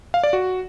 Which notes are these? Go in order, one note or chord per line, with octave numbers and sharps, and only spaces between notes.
F5
D5
F#4